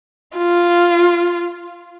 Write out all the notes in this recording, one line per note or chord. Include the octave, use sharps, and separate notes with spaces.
F4